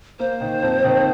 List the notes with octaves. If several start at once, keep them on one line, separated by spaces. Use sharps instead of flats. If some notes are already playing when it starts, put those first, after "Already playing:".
A#3 C5
D#3
F2
D#3